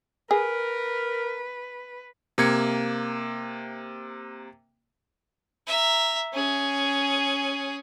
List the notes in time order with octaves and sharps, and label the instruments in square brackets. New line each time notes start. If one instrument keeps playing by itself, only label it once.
[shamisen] G#4 [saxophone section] A#4 [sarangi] B4
[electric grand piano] C3 A#3 G#6 C#7
[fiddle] E5 A#5
C#4 G#4